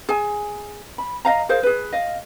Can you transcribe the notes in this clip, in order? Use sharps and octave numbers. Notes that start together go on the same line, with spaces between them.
G#4 G#5
B5
D#5 F5 A#5
G#4 A#4 C5 F5
G#4 B4
D#5 F5